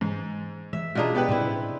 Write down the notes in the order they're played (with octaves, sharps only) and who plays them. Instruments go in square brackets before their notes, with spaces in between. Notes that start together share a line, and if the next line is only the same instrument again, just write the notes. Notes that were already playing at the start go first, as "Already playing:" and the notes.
[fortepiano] G#2 [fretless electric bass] E3 G#3
[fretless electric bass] E3 G#3 [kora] E5
[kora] B2 D4 G#4 [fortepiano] F4 D#5 A#5
[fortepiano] B3 G4 B4 [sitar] D5
[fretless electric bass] A2 C3 C#4 [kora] C4 E4